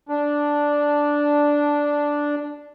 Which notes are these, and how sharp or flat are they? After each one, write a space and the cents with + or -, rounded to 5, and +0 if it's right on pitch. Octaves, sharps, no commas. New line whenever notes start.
D4 -5